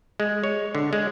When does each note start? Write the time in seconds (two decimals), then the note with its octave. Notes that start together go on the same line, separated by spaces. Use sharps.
0.20 G#3
0.44 C#5
0.75 D3
0.93 G#3